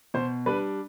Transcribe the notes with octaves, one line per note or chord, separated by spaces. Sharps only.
B2 C5
G3 D4 B4